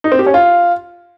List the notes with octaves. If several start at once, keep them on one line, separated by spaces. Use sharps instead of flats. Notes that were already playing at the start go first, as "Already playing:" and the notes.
D#4
C4
G4
C#4
F4